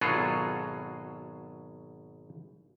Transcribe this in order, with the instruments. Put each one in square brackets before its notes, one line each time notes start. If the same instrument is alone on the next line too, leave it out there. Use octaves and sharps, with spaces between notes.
[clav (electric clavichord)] G#1 B2 F#3 F4 G#4 A4